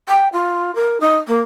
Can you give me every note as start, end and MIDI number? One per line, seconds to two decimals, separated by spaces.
0.09 0.28 79
0.33 0.74 65
0.75 0.98 70
1.00 1.17 63
1.28 1.40 58